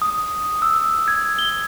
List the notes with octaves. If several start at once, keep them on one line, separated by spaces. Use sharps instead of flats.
D#6
E6
G#6
G7